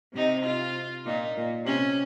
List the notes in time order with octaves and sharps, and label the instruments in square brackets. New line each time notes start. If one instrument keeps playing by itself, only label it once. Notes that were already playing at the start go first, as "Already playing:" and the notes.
[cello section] C3 [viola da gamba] D#4
[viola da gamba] F4
[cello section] A#2 [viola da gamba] D#4
[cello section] A#2
[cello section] C3 [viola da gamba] C#4